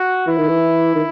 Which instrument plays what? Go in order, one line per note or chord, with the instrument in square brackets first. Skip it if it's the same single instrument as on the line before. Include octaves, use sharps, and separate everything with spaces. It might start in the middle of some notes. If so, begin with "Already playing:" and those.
Already playing: [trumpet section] F#4
[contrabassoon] E3 [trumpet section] E4
[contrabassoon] D#3
E3
D#3